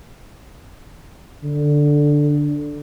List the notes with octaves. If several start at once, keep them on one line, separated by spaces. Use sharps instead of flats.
D3